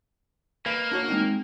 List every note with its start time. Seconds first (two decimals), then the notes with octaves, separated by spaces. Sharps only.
0.66 A#3 B4 D#5 F5
0.92 D4 F#4 C#5
1.08 G#3 C4 D#4